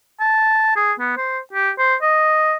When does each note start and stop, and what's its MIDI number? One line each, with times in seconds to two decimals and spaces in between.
0.21 0.73 81
0.76 0.93 68
1.00 1.16 59
1.17 1.39 72
1.53 1.70 67
1.78 1.95 72
2.02 2.57 75